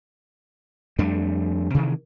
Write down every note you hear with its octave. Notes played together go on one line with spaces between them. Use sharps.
F2 G3 A3 D4
C3 D#3 E3